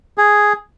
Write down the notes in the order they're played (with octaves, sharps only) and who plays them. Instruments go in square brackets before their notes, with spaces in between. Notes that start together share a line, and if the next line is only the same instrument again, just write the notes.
[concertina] G#4